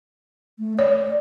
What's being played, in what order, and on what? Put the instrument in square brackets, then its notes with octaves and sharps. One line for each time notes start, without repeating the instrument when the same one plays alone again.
[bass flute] A3
[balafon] C#5 [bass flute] D5